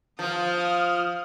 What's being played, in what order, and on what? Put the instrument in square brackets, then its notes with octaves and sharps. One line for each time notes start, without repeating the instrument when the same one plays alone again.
[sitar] F3 [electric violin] D#6 F6